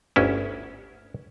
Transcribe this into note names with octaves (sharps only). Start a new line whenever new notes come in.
G1 D2 C#4 E4